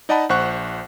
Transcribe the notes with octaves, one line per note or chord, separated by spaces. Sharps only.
D#4 D5 D#5 F#5 A5 B5
A#1 C5 F#5 C#6 F#6